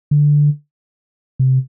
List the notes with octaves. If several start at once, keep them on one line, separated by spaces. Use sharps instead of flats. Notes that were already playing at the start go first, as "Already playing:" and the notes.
D3
C3